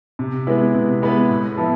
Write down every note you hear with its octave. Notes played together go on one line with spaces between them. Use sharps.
C3
G#3 B3 E4 B4
C3
G#3 B3 E4 B4
A2
F3 B3 E4